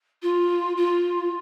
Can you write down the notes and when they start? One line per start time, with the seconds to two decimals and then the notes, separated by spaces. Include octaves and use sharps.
0.22 F4
0.77 F4